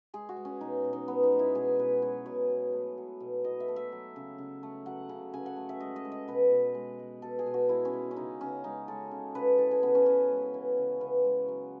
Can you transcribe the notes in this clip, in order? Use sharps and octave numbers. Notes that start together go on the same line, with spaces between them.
G#3 G#4
F#4
G#3
C#4
B2 D#4
B2
D#4
G#3 B3
D#4
G#3
E4
B2 G#4
B2 B4
F#3 C#5
B2 C#5
B2
A3
F#3
B2
B2 D#5
E5
A3
E5
F#3
C#3
C#3
A3
F#3 F#5
C#3
C#3 G#5
F#5
A3
E5
G#3 D#5
D#5
G#3
D#5
B2 B4
B2
G#3
G#3
B2 A4
G#4
B2
F#4
G#3 E4
C#4
G#3
C#4
C#3 D#4
C#3 C#4
G#3 D#4
G#3 A4
C#3
C#3 B4
E3 A4
G#4
C#3 B3
C#4
C#3 C#4
G#3
E3
C#3
C#3 B3
G#3
F#3